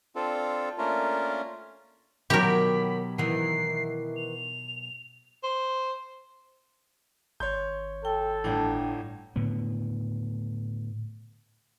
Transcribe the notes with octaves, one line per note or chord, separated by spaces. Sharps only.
C4 D4 F4 A4
A3 A#3 C#4 D4 F4 A#4
B2 D#3 F#3 G4 A#4 C#5 B5
D#3 E3 C7
F7
C5
G#1 C#5 C6 G6
A4 G5
G1 A2 D4 G5
A2 D3 B3